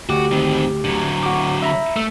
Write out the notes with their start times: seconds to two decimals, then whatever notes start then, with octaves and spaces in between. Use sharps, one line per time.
0.09 D2 F#4 G4 D6
0.32 D#3 C4
0.84 D3 F#3
1.23 F#4 D6
1.62 E5 A#5 B5
1.96 A3 E6